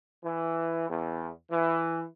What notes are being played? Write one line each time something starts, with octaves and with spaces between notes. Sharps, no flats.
E3
E2
E3